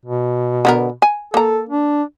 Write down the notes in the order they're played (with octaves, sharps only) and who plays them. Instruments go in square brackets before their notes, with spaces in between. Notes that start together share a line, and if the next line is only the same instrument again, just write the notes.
[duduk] B2
[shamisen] D3 B3 A#4
G#5
[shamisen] A#3 A#5 [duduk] A4
[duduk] D4